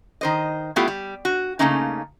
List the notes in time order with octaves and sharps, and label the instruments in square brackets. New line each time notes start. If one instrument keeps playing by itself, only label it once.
[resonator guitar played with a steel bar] D#3 C5 D#5
G3 A3 B3 E4 F4 G4
G3
F#4
C#3 F3 A3 A#3 C#4 D#4